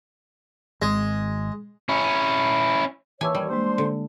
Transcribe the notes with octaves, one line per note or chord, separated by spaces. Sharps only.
G#1 G#3
C#4 E4
D#2 E3 C#5 G#5 A5 D6 E6
G3
G#3 A#3 D4 C5 C6
D3